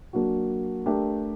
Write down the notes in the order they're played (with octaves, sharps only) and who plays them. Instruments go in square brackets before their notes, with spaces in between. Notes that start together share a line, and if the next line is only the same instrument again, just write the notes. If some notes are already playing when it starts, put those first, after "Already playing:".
[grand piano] F#3 A#3 D4 F#4
A3 D4 G4 A#4